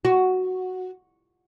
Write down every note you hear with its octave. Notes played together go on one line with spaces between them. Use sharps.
F#4